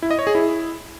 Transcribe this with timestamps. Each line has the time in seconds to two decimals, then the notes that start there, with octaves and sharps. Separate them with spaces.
0.02 E4
0.11 D#5
0.19 C#5
0.27 G#4
0.35 E4